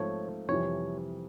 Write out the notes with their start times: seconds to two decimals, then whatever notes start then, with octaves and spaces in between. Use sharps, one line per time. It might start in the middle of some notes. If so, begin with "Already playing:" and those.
Already playing: G#2 F3 A3 C4 C#5
0.48 F2 C3 E3 G3 C#5